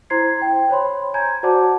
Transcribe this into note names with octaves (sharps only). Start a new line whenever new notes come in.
E4 C5 A#5 C6 G#6 C7
G5
C5 C#5 B5 C6
G#5 A#5 G6 G#6
F#4 C5 D5 F#5 A5 D6